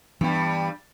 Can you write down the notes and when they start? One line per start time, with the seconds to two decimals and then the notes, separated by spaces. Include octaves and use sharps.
0.21 G2 E3 G3 B3